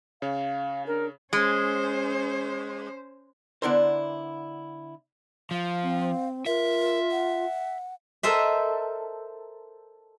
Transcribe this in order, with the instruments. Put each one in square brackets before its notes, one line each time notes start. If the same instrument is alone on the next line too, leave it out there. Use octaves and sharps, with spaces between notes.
[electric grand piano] C#3 C#5 [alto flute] F5
[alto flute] D4 [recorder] A#4
[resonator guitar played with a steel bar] G#3 [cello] C#4 C5
[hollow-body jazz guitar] D3 B3 D4 E4 A#4 C5
[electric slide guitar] F3 [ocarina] F5
[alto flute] C4
[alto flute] F4 [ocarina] A#4 [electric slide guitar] E5
[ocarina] F#5
[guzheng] A4 A#4 C5 D#5 E5